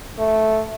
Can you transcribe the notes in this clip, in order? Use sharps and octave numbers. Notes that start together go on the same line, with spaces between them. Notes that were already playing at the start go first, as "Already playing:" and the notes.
A3